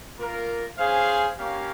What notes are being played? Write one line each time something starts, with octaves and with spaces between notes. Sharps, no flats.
A#3 F4 A#4
C#4 G#4 C5 F5
A#3 C#4 G4 C#5 F5